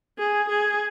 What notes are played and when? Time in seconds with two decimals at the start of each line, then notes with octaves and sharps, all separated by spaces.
0.19 G#4
0.49 G#4